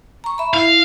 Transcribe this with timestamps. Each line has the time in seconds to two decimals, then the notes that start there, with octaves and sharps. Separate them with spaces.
0.24 A#5 C#6
0.38 E5 B5
0.54 E4 F5